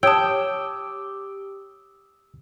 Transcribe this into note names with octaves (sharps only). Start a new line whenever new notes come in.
G4 C#5 G5 A5 D#6 E6